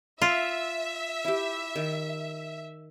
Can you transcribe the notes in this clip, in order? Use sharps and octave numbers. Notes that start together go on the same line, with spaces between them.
F4 E5
E4 G4
D#3